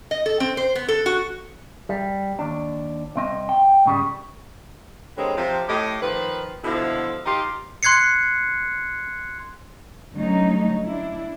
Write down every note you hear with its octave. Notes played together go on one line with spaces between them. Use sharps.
D#5
A4
C4
C5
B3
A4
F#4
G3
D#2 D4
C2 C4 D#5
G5
G#2 C#3 G3
D3 G3 G#3 A#3 C4 C#5
C3 F3
A2 G4 D#5
D#3 F3 B4
B2 D3 F3 E4
D#3 D#4 F4 G4
C6 F#6 G#6 C7 C#7
D3 F#3 G3 A3 C#4 D#4
D4 E4